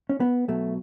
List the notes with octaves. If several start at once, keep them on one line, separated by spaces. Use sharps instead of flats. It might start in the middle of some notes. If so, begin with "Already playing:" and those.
C#4
B3
B1 B2 F#3 A3